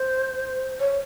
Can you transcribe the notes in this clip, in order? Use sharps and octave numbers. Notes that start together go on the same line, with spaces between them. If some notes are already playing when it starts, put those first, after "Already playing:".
Already playing: C5
C#5